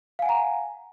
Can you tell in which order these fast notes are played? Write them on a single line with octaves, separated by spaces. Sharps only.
F5 G#5 F#5 A#5